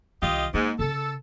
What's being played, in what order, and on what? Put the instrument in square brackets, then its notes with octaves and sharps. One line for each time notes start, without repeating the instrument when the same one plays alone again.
[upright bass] C2 D#3 [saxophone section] F4 G4 D#5
[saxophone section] G#2 [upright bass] A#3
[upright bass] C#3 [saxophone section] A4